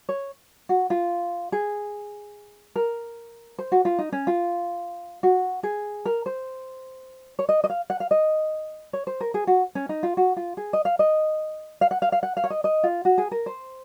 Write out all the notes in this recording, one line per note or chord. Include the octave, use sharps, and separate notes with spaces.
C#5
F#4
F4
G#4
A#4
C5
F#4
F4
D#4
C#4
F4
F#4
G#4
A#4
C5
C#5
D#5
D#5
F5
F#5
F5
D#5
C#5
C5
A#4
G#4
F#4
C#4
D#4
F4
F#4
F4
G#4
D#5
F5
D#5
F5
F#5
F5
F5
F#5
F5
C#5
D#5
D#5
F4
F#4
G#4
A#4
C5